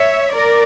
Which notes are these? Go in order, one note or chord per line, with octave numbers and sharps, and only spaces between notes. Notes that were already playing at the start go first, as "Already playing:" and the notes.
Already playing: C#5 E5
A#4 D5